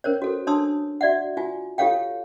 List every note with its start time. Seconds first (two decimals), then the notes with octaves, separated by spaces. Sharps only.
0.04 C#4 A#4 C5 C#5
0.22 F#4 A4
0.47 D4 C#5 A5 C6 D#6 E6
1.01 F#4 D5 E5 F#5
1.37 F4 F#4 G#5
1.78 F4 G4 A4 C#5 F5 G5